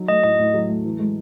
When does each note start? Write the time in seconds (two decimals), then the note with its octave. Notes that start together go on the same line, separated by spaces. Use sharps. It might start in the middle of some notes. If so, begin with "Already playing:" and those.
Already playing: F#3 D#4
0.08 A3 D#5
0.24 A2 D#5
0.39 A2
0.54 F#3
0.69 A3
0.85 E3
0.99 G#3